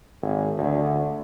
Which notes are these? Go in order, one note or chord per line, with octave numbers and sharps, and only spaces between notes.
G#1
D2